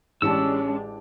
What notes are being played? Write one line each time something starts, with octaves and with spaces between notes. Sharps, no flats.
A1 G#3 C#4 D4 G4 A5 E6